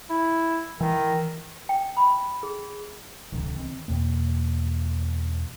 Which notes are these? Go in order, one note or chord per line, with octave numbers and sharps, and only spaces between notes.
E4
D#3 E3
G5
B5
G#4
D1 C2 D3 E3
D#3 B3 C4
E2 B2 A#3